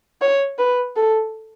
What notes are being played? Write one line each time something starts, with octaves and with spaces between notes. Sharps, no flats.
C#5
B4
A4